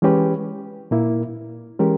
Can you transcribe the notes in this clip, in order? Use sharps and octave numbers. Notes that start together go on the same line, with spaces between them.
E3 G#3 C#4 G4 B4
A#2 A#3 E4
E3 G#3 C#4 G4 A#4